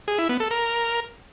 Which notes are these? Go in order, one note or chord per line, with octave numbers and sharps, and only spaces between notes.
G#4
E4
B3
A4
A#4